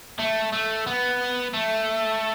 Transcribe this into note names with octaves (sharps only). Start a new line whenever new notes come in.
A3
A3
B3
A3